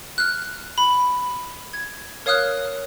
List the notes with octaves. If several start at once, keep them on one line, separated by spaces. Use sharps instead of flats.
F6 F#6
B5
G#6
A#4 C#5 F5 D#6 F6 F#6